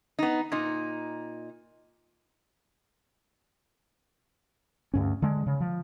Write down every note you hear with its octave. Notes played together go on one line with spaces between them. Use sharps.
B3 D#4
A#2 D#4
D2 G2 C#4
D3 G#3
C#3
F3